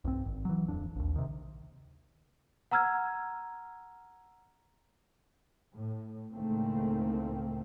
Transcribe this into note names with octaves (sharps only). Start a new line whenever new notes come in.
B1 G2 C4
G#1
E3 F#3
D1 F2 D4
A#1 D#2
C3 D#3
F#5 A#5 E6 F6 G#6
A2
C#2 A2 D#3 A3 A#3 C4